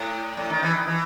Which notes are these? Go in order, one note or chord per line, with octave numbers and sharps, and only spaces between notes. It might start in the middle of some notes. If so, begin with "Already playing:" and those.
Already playing: A2
A2
D#3
E3
D#3
E3